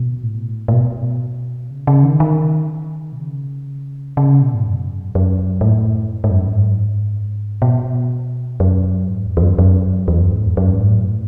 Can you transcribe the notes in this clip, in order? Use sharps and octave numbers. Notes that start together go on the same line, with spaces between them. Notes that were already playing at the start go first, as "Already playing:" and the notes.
Already playing: B2
A2
A2
B2
C#3
C#3
D#3
D#3
B2
C#3
C#3
B2
G#2
F#2
F#2
G#2
A2
G#2
F#2
G#2
B2
F#2
G#2
E2
E2
F#2
F#2
E2
F#2
G#2
E2
F#2
G#2
A2